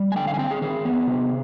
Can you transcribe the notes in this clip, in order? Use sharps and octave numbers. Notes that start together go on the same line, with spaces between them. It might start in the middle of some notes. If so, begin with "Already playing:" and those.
Already playing: G3
G#5
D3 G5
F5
G#5
C4 G5
G#4
D#3 G#4
B3
C3